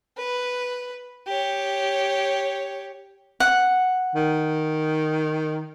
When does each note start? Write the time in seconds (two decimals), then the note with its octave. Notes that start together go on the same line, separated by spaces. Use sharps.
0.17 B4
1.27 G4 C#5
3.40 F#5
4.15 D#3